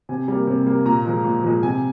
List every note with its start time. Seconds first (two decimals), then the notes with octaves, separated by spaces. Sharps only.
0.09 C3 G#5
0.28 G3 A#3
0.47 C3
0.66 G3 A#3
0.85 A#2 A#5
1.05 F3 G#3
1.24 A#2
1.43 F3 G#3
1.63 C3 G#5